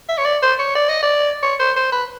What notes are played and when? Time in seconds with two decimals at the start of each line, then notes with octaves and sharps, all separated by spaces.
0.09 E5
0.18 C#5
0.25 D5
0.42 C5
0.59 C#5
0.75 D5
0.89 D#5
1.03 D5
1.43 C#5
1.59 C5
1.76 C5
1.92 B4